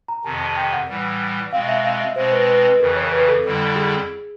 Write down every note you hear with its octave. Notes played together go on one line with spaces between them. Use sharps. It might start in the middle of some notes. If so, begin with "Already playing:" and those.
A#5
F2 C3 D#3 A5
A5
G5
F#5
A2 E3 G3
B2 G#3 C4 F5
E5
F5
E5
B2 G#3 C4 C5
B4
B4
B4
F2 C#3 E3 A#4
C#5
B4
A4
F2 D3 G3 C4 E4
G#4